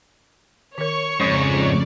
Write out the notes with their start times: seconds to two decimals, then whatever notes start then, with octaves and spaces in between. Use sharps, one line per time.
0.78 D#3 A#4 C#5 C#6
1.20 F2 G#2 C#3 F3 C#4 D5